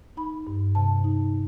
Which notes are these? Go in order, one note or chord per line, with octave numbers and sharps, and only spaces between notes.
D#4 B5
G2
C3 A5
D#4